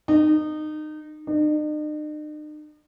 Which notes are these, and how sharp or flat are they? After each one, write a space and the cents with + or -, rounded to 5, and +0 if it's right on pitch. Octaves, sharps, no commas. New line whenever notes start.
D#4 -25
D#4 -45